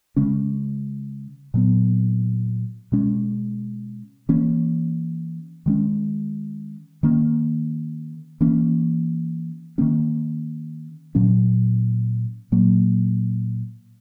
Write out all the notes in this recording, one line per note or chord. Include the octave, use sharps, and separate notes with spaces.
C#3 G#3 C#4
A#2 F#3 B3
B2 G#3 C#4
E3 A#3 C#4
D#3 G#3 C#4
D#3 A#3 C#4
E3 A#3 C#4
D#3 F#3 A#3 C#4
A#2 F#3 C#4
A#2 F#3 A#3